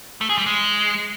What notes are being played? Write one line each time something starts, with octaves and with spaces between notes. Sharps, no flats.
A3
G#4
G3
G#3